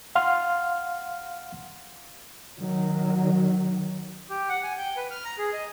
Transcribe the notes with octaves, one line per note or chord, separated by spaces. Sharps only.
F5 F#5 C6 F6
D#3 F#3
G4
F#5
G#5
G5
B4
F6
A#5
G#4
D#5